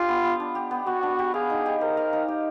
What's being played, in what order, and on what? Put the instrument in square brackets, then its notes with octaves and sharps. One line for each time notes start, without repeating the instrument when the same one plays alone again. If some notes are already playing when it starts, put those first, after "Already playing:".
Already playing: [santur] D4 G4 [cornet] F4
[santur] B3
B3
D4
G4
B3
[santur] B3 [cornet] F#4
[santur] D4
G4
[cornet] G#4 [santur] F5
[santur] D#4
G4
[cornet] A#4 [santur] C5
[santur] F5
D#4
G4